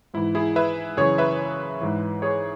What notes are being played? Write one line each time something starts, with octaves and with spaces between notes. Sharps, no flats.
G#2 E3 E4
E4 G#4
B4 E5
F#2 C#3 E3 G#4 C#5
B4 E5
G#2 E3
G#4 C#5